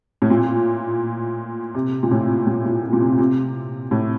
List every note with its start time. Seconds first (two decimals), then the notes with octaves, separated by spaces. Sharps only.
0.22 A2
0.30 A#2
1.75 C3
2.03 A#2
2.11 A2
2.47 A#2
2.66 A#2
2.93 A#2
3.00 C3
3.19 C3
3.91 A2